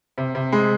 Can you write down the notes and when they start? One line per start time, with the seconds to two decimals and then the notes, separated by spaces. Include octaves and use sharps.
0.18 C3
0.35 C3
0.52 G#3